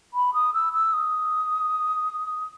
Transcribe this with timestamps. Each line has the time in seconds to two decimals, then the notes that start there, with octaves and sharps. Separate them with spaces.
0.14 B5
0.34 D#6
0.54 E6
0.73 E6
0.93 D#6